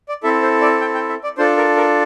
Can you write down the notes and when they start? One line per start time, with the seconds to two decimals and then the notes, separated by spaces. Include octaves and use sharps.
0.09 D5
0.23 C4 E4 A4 E5
0.42 C5
0.61 D5
0.81 G5
0.95 G5
1.09 E5
1.24 D5
1.37 D4 F4 A4 C5
1.57 A#4
1.77 A#4